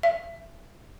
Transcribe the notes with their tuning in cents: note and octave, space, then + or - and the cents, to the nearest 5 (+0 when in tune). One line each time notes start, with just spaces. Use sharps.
E5 +30